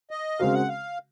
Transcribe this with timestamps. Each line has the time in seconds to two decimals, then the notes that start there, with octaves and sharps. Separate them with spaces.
0.11 D#5
0.39 C#3 G#3 C4 F#4 A#4 F5
0.54 F#5
0.68 F5